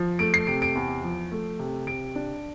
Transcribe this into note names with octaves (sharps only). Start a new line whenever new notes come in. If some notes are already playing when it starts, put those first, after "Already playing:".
Already playing: F3
A3 D7
C7
C3 D7
D7
E2
F3
A3
C3
C3 D7
D4